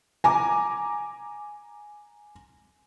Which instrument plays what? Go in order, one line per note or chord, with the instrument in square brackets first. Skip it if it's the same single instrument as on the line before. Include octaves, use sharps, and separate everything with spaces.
[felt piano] G#5 A#5 D6